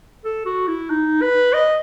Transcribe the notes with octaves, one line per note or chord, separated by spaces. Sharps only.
A4
F#4
E4
D#4
B4
D#5